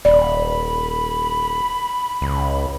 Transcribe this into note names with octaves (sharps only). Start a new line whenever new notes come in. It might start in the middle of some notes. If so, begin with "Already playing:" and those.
D#1 D5 B5
C#2